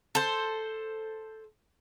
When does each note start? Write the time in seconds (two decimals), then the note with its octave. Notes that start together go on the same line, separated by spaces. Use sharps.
0.15 A4 C5